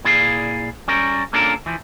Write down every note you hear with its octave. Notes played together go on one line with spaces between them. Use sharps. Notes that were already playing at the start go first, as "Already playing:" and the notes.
A#2 E4 G#4 D5 F5
G3 C#4 A#4
A#3 C#4 D4 F4 A4 A#4
E3 F3